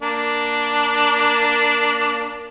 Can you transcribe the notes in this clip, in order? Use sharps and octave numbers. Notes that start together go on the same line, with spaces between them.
A#3 D4